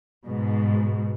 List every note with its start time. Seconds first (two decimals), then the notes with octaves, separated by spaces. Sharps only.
0.26 G#2 B2